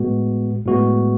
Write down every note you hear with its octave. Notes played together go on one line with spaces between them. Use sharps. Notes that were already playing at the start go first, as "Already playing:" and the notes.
Already playing: A2 G#3 B3 F#4
A2 G#3 B3 F#4